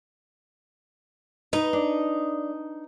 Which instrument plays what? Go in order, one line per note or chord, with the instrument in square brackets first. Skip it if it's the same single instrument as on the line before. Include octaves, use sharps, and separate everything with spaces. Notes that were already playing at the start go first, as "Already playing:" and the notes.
[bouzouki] D#4 [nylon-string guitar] B4
[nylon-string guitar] D4